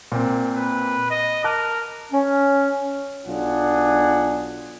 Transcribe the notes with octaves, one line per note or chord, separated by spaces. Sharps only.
A#2 A#3 C4
B4
D#5
A#4 A5 D6 F#6
C#4
B1 D4 F4 G#4 F#5